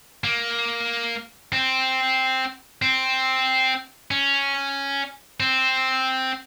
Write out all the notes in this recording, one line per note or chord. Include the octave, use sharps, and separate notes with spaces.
A#3
C4
C4
C#4
C4